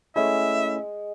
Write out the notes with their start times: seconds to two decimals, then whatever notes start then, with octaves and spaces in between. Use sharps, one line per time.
0.16 G#3 A3 C#4 E4 E5